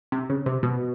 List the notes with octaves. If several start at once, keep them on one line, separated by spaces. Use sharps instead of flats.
C3
C#3
C3
B2